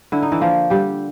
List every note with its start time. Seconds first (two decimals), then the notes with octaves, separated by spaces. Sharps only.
0.12 D3 E4
0.22 D#4
0.32 E3 E4
0.41 F3 A#3 F4
0.70 D3 G3 G4